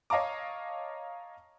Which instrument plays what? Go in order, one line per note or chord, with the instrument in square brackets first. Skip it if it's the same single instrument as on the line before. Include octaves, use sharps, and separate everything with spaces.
[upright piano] C#5 D#5 F5 A5 A#5 D6